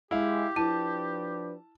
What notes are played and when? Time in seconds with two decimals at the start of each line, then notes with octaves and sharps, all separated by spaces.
0.11 G#3 E4 G4 F5
0.56 F3 D4 E4 B4 A5